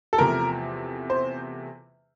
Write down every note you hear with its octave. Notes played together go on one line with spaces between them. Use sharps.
A4
E2 C3 F3 A3 A#4
C5